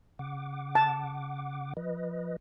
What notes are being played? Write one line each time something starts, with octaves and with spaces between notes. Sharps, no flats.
C#3 F#5 D6
A5
F3 B4 D#5